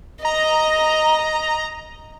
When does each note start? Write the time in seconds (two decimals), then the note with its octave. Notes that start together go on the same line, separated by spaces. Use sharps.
0.25 D#5 A#5